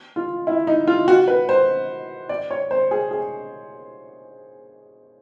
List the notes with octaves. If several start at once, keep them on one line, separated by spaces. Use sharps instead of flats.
F4
E4
D#4
F4
F#4
B4
C5
D5
C#5
C5
G#4
G#4